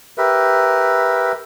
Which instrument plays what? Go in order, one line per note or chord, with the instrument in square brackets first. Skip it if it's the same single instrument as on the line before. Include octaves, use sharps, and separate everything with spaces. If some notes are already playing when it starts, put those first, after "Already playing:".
[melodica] G4 A#4 B4 E5